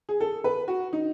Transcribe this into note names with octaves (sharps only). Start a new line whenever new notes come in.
G#4
A4
B4
F#4
D#4